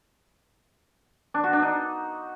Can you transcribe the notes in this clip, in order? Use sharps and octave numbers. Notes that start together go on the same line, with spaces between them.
D4
F#4
D4
D#4